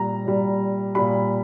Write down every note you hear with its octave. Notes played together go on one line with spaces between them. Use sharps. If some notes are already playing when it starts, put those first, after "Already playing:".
Already playing: A#2 G3 A#5
A#2 G3
A#2 G3 B5